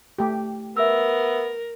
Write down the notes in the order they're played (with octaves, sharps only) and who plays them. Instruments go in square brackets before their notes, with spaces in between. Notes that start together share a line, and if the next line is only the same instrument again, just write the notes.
[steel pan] A3 G4
[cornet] B3 [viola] A#4 [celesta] E5 E6